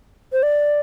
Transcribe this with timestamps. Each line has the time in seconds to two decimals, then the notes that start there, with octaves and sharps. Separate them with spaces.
0.33 C5
0.43 D5